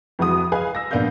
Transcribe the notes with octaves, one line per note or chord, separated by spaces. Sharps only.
F2 E3 G#3 F#4 D#6
G#4 B4 D#5 F5 G#5
E6 A#6
A#1 B3 D4 A#4 F5 G6